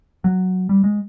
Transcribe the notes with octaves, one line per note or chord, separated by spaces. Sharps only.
F#3
G3
G#3